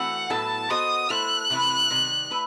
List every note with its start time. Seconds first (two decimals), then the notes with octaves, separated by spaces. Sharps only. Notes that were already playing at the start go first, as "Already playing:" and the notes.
Already playing: E3 A3 C4 F#4 F#5
0.30 A2 F#3 B3 E4 A4 A5
0.70 B3 F#4 A4 C5 D#5 D#6
1.10 A3 E4 A4 C5 F#6
1.50 C3 E3 A3 C4 E4
1.91 C3 D#3 G3
2.30 A3 E4 B4